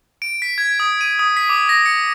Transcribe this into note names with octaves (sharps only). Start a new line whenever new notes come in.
D7
B6
G#6
D#6
D#7
D#6
B6
D6
A#6
C#7